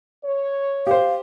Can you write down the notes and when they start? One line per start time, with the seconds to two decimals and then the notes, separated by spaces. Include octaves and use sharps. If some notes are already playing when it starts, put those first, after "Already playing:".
0.23 C#5
0.87 G4 C5 F5